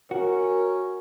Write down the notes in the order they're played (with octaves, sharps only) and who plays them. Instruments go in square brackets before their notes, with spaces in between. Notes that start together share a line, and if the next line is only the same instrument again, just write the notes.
[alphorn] C#4 [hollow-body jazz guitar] F#4 [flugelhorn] A#4